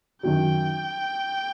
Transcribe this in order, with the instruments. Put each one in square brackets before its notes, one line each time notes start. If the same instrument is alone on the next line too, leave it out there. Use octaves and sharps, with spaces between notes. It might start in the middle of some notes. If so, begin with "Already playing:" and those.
[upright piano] F#2 D#3 F#3 [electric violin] G5